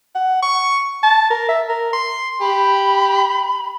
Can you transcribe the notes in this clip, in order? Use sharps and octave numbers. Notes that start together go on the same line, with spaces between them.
F#5
C#6
A5
A#4
E5
A#4
C6
G4 B5